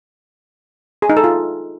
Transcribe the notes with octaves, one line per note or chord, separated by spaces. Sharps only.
G#4
D#4
A4
F4